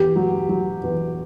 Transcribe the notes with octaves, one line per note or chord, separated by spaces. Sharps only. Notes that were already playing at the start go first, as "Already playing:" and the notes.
Already playing: E2 G4
F#3
F#3
E2